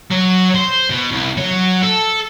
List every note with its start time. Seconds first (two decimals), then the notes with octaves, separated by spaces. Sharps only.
0.11 F#3
0.55 C5
0.90 B2
1.12 C2
1.37 F#3
1.83 A4